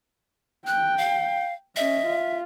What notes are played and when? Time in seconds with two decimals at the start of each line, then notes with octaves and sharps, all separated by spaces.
0.67 G5 F#6
0.98 F5
1.76 C#4 D#5 E5
2.07 F4